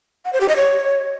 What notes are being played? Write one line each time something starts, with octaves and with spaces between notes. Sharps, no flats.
F#5
C5
G4
D#5
C#5